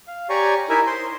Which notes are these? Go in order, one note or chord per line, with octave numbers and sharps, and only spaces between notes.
F5
G4 C#5 D5 G#5 A#5 C#6
D#4 E4 A#4 E5 G#5
C5 C6